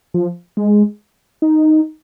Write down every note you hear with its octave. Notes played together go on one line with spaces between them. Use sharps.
F3
G#3
D#4